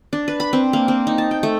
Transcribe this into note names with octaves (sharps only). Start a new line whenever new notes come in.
D4
B4
B5
C4
A#3
C4
D#4
A5
G5
A3